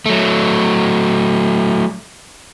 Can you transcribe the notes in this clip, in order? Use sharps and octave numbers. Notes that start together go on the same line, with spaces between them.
F#3 A3